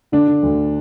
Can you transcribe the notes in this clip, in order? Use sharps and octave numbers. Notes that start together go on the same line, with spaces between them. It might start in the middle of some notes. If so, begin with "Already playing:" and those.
D3 D4
D3
D2